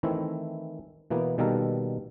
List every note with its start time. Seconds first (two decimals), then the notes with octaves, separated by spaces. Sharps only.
0.03 D#3 E3 A3 C4 E4
1.10 B2 E3 A#3 B3
1.38 B2 D#3 G3 A#3 A4 A#4